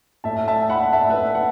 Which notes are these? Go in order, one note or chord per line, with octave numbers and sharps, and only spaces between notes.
A2 A3 E5 A5
E5 A5
F#5 B5
A2 A3 E5 A5
B4 E5
F#5